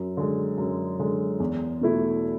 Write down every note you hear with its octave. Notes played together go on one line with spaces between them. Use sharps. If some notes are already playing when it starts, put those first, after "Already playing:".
Already playing: F#2
D3 G#3
F#2
D3 G#3
E2
B2 A3 E4